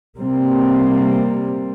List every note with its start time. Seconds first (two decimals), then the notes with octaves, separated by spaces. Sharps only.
0.17 C3 G3 A#3 C4